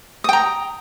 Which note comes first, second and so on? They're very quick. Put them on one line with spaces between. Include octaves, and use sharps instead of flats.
D#6 G5 A#5